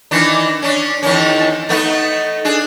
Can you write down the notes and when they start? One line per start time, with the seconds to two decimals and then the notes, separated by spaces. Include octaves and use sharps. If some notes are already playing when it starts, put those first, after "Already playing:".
0.11 D#3 E3 D4
0.62 C#4 D4
1.03 E2 D#3 C#4
1.69 A3 B3 D#4
2.45 D4 G#4